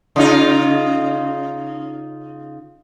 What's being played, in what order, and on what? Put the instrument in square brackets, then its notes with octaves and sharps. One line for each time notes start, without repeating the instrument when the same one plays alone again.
[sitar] C#3 D#4 F4